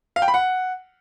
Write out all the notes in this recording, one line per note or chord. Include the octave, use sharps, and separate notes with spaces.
F5
G5
B5
F#5